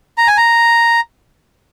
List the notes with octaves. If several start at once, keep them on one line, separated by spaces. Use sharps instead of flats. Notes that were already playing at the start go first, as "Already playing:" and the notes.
A#5
G#5
A#5